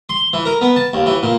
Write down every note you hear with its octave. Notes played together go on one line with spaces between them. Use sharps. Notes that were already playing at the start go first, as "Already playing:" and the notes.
C6
E3
A#4
B3
A5
D#2
E3
A#2